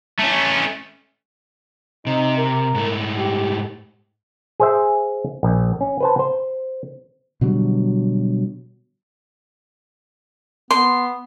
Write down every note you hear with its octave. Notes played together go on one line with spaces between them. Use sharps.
A3 C#4
C3 D#4
A#4
G#2 A3
G4
G#4 C5 E5
A#1
C#4
B4 C5 A5
C5
B2 D3 F#3 G3
B3 C6